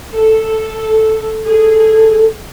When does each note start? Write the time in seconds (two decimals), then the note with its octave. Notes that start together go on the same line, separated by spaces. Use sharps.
0.12 A4
1.44 G#4 A4